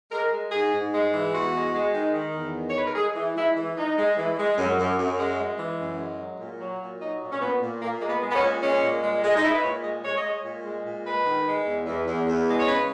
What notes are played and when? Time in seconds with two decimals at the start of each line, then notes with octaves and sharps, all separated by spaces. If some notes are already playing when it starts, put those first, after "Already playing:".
0.12 G#3 A#4
0.32 G#3
0.52 G#2 G#4
0.73 G#2
0.93 G#3
1.13 E3
1.33 E2 F#4
1.54 G#3
1.73 G#3
1.94 D#3
2.14 D#3
2.35 E2
2.54 D#3
2.69 C#5
2.75 G#3 B4
2.86 A#4
2.95 G#3 G#4
3.15 E3
3.35 G#3 E4
3.56 E3
3.76 G#3 D#4
3.97 G#3
4.16 E3
4.37 G#3
4.57 F#2
4.78 F#2
4.98 F#2
5.18 G#3
5.38 G#3
5.58 E3
5.79 F#2
5.99 G#3
6.19 F#3
6.39 A#2
6.60 F#3
6.80 A#2
7.00 F#3 D#4
7.21 A#2
7.32 C#4
7.40 A#2 B3
7.61 A#2
7.81 A#2 A#3
8.01 G#3 A#3
8.08 B3
8.21 G#3
8.30 B3
8.35 C#4
8.42 A#2
8.62 G#3 C#4
8.82 A#2
9.03 G#3
9.23 G#3
9.36 D#4
9.43 G#3 E4
9.54 B4
9.63 A#2 C#5
9.84 G#3 D#5
10.04 G#3 C#5
10.16 D#5
10.25 G#3 C#5
10.44 A#2
10.64 G#3
10.85 A#2
11.05 G#3 B4
11.25 D#3
11.45 G#3
11.65 E2
11.86 E2
12.06 E2
12.27 E2
12.47 G#3
12.59 C#5
12.67 C#3 B4